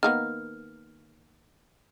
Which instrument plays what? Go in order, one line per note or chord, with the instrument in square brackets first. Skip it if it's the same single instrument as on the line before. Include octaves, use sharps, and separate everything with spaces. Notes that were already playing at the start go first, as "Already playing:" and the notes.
[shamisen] D#3 A#3 B3 [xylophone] F6